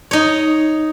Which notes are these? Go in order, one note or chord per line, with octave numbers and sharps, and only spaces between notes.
D#4 C#5